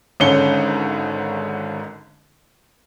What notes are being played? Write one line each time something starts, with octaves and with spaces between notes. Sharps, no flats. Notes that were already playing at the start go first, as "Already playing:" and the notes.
G#1 G#2 D3 C#4 C#7 G7